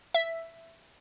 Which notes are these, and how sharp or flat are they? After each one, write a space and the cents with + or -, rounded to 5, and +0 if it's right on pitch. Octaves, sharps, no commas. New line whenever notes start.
E5 +5